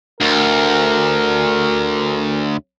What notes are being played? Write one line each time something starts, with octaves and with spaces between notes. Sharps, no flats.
D2 A#4